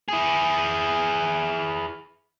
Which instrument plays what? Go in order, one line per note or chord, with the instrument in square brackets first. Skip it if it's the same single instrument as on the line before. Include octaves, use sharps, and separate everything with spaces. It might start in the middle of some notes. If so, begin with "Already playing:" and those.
[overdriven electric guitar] E4 G#4